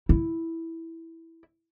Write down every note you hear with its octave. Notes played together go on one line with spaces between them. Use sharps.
E4